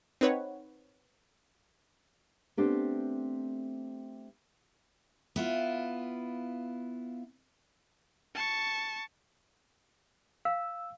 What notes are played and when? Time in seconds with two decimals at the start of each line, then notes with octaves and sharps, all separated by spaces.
0.21 C4 D#4 B4 C#5 F#5
2.57 A3 B3 C4 D4 G4 A4
5.36 B3 E4 F4
8.35 A5 C#6
10.45 F5 E6